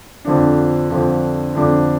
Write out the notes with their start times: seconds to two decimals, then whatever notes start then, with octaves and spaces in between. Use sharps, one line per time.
0.25 F2 D3 F3 D4
0.90 F2 D3 F3 D4
1.55 F2 D3 F3 D4